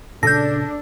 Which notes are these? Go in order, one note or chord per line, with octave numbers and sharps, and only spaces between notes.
A#2 C#3 D4 A4 G6 A#6